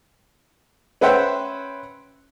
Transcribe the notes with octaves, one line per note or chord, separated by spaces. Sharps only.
C#4 B4 C5 E5 F#5 G5